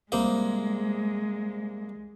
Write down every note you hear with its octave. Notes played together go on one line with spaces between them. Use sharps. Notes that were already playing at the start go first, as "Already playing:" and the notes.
C2 G#3 A#3 C5